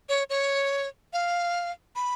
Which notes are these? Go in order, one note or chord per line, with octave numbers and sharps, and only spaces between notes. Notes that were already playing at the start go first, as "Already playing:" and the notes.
C#5
C#5
F5
B5